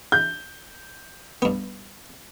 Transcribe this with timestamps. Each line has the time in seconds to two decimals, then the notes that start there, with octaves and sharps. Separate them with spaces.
0.12 G6
1.42 G2 B3